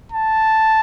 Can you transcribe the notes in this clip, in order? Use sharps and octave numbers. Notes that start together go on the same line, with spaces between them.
A5